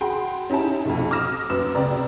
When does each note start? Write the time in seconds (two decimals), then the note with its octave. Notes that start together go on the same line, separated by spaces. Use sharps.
0.01 F#4 G#4 G5 B5 C6
0.50 C#4 D#4 E4 G4 A5
0.85 B1 F2
1.11 D6 D#6 F6 A#6 E7
1.50 F#2 B4 E6 E7
1.75 C#2 C3 B4 D5 A#5